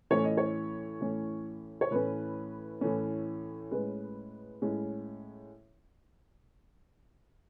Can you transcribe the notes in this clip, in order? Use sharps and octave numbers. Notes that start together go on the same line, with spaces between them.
A2 E3 A3 C#4 C#5
D#5
C#5
A2 E3 A3 C#4
C#5
A2 E3 A3 C#4 B4
A2 E3 A3 C#4
A2 G#3 C#4 B4
A2 G#3 C#4